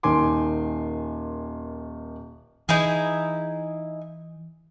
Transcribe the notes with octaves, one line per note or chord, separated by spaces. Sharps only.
D#1 D#3 G#5 C6 D6
E3 D#4 E4 G#4